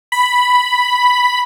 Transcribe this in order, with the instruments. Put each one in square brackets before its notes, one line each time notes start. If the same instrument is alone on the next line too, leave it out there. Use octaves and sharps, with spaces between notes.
[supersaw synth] B5